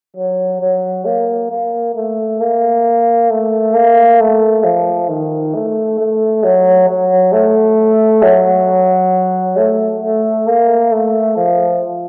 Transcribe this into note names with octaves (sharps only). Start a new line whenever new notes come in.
F#3
F#3
A#3
A#3
A3
A#3
A3
A#3
A3
F3
D#3
A3
A3
F#3
F#3
A3
F#3
A3
A3
A#3
A3
F3